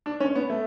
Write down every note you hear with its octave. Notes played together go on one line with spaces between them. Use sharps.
D4
C#4
B3
A3